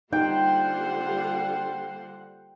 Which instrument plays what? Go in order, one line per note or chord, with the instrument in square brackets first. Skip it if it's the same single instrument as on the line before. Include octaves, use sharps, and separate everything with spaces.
[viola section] D3 G3 F#5 [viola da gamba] A#3 F4 C5 [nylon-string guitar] D#4 [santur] G5